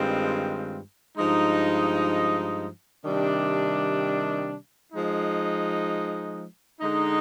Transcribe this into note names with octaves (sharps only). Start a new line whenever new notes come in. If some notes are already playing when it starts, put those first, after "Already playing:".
Already playing: G2 D#3 G#3 C4 F4
G2 F3 G#3 D#4
C3 D#3 G3 D4
F3 G#3 D#4
D3 G#3 D#4